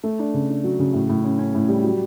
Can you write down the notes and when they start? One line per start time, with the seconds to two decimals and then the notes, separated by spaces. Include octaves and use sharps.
0.03 A3
0.19 D4
0.34 C#3
0.50 D4
0.64 F#3
0.79 C#3
0.94 A2
1.09 A2
1.24 C#4
1.39 C#4
1.55 A2
1.69 G3
1.84 F#3